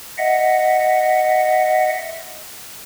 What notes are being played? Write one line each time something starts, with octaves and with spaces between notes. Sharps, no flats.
D#5 E5 F#5